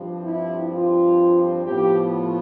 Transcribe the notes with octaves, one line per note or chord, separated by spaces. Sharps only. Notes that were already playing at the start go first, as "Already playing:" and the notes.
Already playing: G2 F3 C4
E4
F4
A2 F3 B3 G4